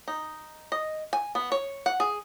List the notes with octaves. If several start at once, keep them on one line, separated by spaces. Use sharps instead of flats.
D#4
D#5
G#5
B3
C#5
F#5
G#4